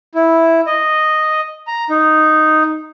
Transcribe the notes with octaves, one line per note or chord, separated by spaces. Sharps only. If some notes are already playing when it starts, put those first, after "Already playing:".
E4
D#5
A#5
D#4